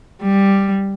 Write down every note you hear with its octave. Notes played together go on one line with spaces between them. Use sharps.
G3